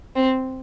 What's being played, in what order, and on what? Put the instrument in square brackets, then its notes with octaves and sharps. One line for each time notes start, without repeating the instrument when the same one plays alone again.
[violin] C4